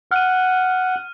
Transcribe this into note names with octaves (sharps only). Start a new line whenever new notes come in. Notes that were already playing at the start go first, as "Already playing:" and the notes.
F#5 F6 D#7